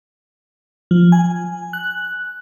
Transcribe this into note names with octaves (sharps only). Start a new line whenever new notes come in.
F3
G#5
F#6